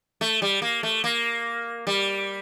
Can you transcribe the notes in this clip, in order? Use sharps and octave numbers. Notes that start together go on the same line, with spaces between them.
A3
G3
A#3
A3
A#3
G3